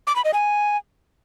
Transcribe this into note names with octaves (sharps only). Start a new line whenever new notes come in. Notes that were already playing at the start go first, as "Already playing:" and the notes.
D6
B5
D#5
G#5